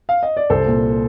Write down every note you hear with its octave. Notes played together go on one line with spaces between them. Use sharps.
F5
D#5
D5
C2 A4 C5
A#2